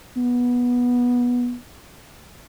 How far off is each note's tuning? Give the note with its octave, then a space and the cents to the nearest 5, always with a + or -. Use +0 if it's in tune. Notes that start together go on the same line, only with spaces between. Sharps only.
B3 -15